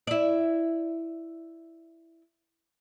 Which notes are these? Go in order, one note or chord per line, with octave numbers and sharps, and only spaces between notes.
E4 D5